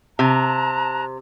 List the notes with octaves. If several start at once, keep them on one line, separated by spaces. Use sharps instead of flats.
C3 A5 A#5 F#6